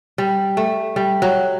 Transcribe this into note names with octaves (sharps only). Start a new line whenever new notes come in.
G3
A3
G3
F#3